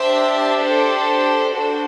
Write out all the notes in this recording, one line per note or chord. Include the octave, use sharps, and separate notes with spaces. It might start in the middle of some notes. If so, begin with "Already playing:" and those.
Already playing: D4 G4 C5 E5
A4 C5
D4 F#4 A4 C5